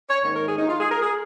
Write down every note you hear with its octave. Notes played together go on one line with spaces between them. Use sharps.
C#5
G#2 D#3 A#3 C#5
A#4
G#4
D#4
F4
G#4
A#4
G#4